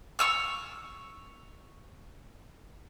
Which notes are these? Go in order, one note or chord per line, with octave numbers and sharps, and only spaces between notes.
C#6 E6 F6